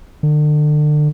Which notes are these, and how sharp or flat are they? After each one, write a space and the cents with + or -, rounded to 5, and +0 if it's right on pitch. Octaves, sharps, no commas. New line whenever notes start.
D3 +35